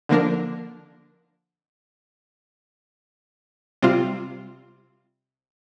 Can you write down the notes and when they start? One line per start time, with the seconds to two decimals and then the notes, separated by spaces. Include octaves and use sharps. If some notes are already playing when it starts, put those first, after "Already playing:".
0.09 D3 F3 A#3 D4 A#4
3.82 C3 G3 C4 F4